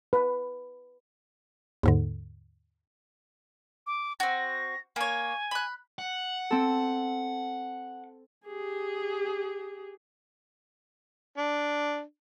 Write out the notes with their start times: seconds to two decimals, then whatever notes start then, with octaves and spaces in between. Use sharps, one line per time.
0.13 B4
1.83 D#2 G#2 D3
3.87 D6
4.20 C4 F#4 A#6
4.96 A#3 C#5 G#5
5.51 B5 F#6
5.99 F#5
6.51 C4 A4
8.46 G4 G#4
11.38 D4